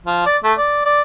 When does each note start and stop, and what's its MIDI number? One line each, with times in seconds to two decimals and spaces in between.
0.06 0.23 53
0.26 0.37 74
0.44 0.53 57
0.58 0.86 74
0.86 1.02 74